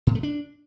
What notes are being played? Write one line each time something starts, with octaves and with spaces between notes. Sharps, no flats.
A2
A3
D4